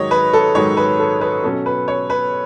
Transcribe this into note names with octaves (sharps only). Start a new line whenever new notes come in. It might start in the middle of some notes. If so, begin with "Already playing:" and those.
Already playing: G#2 D#3 F#3 C#5 D#5
B4
A4
G#2 D#3 F#3 C#5
B4
A4
B4
B2 F#3 C#4 A4
B4
C#5
B4